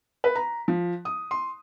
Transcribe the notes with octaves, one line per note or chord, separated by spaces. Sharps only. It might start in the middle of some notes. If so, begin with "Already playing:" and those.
B4
A#5
F3
D#6
C6